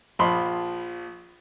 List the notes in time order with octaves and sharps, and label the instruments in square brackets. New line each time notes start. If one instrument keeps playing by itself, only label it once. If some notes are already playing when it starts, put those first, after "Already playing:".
[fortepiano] A#1 F3 B5 C6